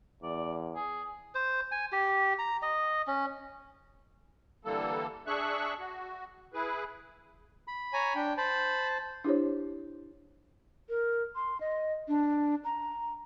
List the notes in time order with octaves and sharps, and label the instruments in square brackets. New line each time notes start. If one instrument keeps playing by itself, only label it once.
[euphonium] E2 [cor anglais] D5
[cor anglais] G#4
[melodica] C5
G#5
G4
A#5
D#5
C#4
[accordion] D3 E3 G3 A#3 A4
D4 G#4 E5 C#6 F#6
F#4
E4 G#4 B4
[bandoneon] B5
[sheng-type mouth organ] C#5 G#5 A#5
D4 G5
[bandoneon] C5 A5 [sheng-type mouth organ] B5
[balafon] D4 E4 G4 C5 C#5
[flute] A#4
C6
D#5
D4
A#5